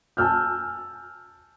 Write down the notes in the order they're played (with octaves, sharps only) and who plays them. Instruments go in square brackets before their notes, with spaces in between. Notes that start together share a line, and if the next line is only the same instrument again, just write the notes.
[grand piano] G#5 A5 E6 F6 G6